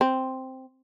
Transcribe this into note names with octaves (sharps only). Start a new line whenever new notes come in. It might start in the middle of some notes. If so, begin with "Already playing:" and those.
C4